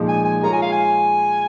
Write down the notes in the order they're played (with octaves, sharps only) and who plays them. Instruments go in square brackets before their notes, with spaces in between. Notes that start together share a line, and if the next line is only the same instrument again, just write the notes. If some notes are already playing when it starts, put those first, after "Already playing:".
Already playing: [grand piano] A#2 F3 G#3 D#4
[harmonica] G#5
G#5
[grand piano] G#3 F4 C#5 [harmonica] A#5
[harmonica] G#5
F5
G#5